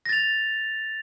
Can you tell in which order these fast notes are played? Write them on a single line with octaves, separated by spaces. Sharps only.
A#6 A6 F7